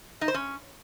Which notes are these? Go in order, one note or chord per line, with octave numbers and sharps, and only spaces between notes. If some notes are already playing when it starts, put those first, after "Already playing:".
D#4
C5
C#4